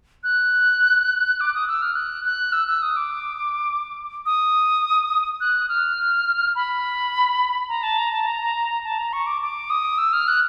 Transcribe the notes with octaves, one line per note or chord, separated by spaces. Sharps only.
F#6
D6
D#6
E6
F6
F#6
F#6
E6
E6
D#6
D6
D#6
F#6
F6
B5
A#5
A5
A#5
A5
A#5
A5
A#5
C#6
D6
D6
D#6
E6
F6
F#6